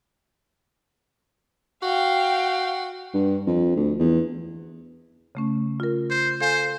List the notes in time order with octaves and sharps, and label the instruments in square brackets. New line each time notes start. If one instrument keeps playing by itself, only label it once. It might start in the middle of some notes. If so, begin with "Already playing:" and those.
[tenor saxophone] F#4 [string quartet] F5 G5
[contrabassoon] G2
F2
D2
E2
[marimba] C#3 A3 C#4
F4 A#4
[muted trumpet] C5
[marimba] A4 F5 G#5 [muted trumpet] C5